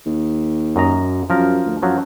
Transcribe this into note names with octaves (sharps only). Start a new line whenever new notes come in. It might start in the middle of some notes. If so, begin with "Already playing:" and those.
D#2
F#2 D#5 A#5
F#2 F3 A#4
D2
F#2 F3 F#3